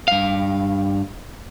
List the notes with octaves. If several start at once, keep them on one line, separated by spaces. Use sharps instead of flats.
G2 F5